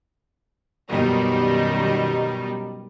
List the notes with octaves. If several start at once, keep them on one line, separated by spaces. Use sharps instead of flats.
F#2 B2 D#3 G3 D#4